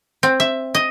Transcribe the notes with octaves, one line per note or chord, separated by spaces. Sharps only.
C4
E5
D#5